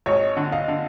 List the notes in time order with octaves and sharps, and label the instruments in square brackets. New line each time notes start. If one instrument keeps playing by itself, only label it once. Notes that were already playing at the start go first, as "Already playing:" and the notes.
[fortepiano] G#1 [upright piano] C#5 D#5
[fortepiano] D3
[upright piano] D#5 F5
[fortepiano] D3